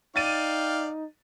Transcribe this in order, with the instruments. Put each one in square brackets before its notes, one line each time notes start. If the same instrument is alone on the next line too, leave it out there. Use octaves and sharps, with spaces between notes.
[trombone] D#4 [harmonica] D5 F5 G5 [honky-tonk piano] A6 D#7